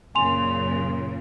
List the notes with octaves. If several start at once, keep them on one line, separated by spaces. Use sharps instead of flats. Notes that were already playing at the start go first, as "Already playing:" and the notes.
F#2 A#2 C#3 G#5 C6 F7